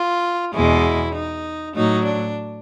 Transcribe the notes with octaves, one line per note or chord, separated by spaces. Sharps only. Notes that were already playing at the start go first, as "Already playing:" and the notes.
Already playing: F4
E2 B2 G#3 E4
D#4
A2 F#3 D#4
D4